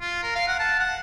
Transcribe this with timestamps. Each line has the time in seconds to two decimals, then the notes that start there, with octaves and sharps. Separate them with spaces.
0.01 F4
0.23 A#4
0.35 F5
0.48 F#5
0.59 A5
0.80 F#5